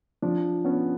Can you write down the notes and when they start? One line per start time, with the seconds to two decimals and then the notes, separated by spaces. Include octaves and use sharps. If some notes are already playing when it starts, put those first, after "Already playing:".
0.22 F3 D4
0.64 B3 C#4